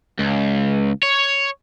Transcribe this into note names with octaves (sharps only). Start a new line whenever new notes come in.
C#2
C#5